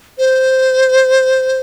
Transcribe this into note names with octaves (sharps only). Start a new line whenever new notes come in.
C5